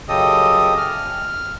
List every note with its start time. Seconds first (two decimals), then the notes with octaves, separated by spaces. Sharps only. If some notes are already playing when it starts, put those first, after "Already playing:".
0.09 F#2 C#3 G4 A4 D#5 D#6
0.77 F6